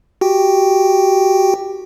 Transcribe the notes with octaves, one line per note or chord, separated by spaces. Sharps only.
F#4 G4 G5